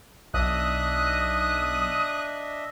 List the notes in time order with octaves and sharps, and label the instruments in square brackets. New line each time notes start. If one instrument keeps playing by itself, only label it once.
[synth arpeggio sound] B1 [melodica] D4 D#5 E5 [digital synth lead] D#6 [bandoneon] F#6